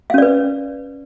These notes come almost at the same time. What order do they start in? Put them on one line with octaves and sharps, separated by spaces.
F5 C#4 D5 B4